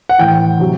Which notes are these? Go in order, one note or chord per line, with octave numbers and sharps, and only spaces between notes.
F#5
A2 E3 G5
C3 F#3